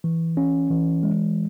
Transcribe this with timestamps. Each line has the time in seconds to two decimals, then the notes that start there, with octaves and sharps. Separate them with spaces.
0.04 E3
0.37 C#4
0.70 E3
1.03 G#3